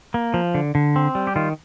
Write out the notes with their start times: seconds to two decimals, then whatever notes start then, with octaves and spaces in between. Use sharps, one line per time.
0.14 A#3
0.34 F3
0.55 D3
0.75 D3
0.96 C4
1.15 G3
1.27 G4
1.36 D#3 F4